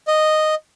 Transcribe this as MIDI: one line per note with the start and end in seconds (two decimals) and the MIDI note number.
0.08 0.55 75